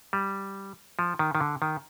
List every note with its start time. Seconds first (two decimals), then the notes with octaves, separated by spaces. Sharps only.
0.13 G3
0.99 F3
1.19 D#3
1.35 D#3
1.41 D3
1.62 D#3